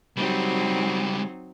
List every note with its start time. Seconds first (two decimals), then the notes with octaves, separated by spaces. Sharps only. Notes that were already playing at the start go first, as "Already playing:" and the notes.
0.16 C#2 F#3 G3 C4 D#4